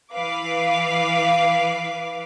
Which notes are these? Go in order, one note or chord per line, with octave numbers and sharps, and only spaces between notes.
E3 B4 F5 D6